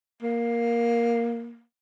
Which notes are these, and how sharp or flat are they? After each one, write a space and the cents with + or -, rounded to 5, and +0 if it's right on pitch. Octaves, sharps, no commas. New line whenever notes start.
A#3 +5